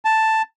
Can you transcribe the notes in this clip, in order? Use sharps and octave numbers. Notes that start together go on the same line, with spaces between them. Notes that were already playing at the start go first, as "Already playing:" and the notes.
A5